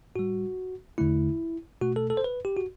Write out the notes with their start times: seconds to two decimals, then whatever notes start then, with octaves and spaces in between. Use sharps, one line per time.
0.16 A2 G3 F#4
0.98 E2 D3 A3 E4
1.81 B2 A3 F#4
1.96 A4
2.10 A4
2.17 C5
2.24 B4
2.45 G4
2.57 F#4